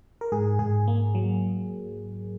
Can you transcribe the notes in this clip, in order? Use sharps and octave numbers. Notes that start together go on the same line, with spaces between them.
A#4
G#2 G#4
G#2 G#4
A#3
F#3